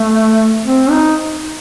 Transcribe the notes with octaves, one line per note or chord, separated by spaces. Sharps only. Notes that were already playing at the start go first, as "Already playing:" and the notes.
Already playing: A3
C4
D#4